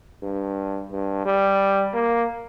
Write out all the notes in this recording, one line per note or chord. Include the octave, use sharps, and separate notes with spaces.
G2
G2
G3
A#3